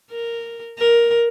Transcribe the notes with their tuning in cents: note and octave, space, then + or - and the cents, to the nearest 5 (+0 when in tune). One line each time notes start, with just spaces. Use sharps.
A#4 -5
A#4 +10